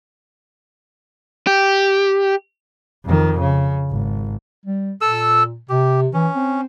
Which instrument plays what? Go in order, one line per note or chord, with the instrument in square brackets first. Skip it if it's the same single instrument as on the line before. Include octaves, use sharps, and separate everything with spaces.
[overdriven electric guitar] G4
[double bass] F2 D#3
C#3
G#1
[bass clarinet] G3
[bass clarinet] A#2 [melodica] A4 E6
[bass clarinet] C3 [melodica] G4
[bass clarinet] E3 [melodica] C#4
[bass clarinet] C4